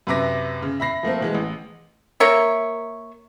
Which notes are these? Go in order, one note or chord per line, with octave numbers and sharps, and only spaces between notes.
F#2 C3 B4 E5 D6 A#6
C#3
E5 B5 A#6 C7
F3 A3 A#3 C4
B2 E3 G#3
A1
A#3 A#4 C#5 E5